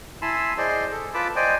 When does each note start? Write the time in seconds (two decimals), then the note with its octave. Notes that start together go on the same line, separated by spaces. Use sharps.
0.22 E4 G#5 A5 B5 C6 E6
0.58 G#4 C5 D5 D#5 C6
0.91 A4
1.14 F4 B4 A5 B5 D6
1.36 C5 D5 D#5 G5 G#5